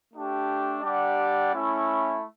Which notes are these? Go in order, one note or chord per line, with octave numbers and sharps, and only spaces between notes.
A3 D4 G4
G3 D4 G4 D5 F#5
A3 C#4 E4